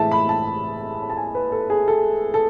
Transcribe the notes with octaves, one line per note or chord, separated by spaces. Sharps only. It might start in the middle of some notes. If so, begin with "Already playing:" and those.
Already playing: A2 E3 G#3 E5 A5
B5
A5
A5
G#5
B4
A4
G#4
A4
A4